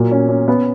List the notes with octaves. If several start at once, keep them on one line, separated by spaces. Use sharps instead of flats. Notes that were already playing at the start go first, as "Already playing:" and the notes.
Already playing: A#2 F#3
C#4
C#4
B3